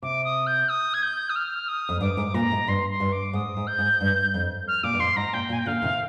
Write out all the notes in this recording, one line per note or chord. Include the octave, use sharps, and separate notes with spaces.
C3 D6
D#6
G6
D#6
G#6
G6
D#6
F6
D#6
F2
G2 D6
G#2
A#2 A#5
G#2
G2 C6
C6
G2
D6
G#2 D#6
G#2
G6
G#2
G2
F2
F6
A#2 D6
G2
F2 C6
G#2 A#5
A#2 G5
A#2
G#5
G5
A#2 D3 F5
C3 D#3